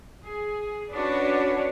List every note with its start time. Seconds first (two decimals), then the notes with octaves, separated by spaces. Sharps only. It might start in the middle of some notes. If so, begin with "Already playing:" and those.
0.25 G#4
0.91 C#4 D4 F#4 B4 C#5 D5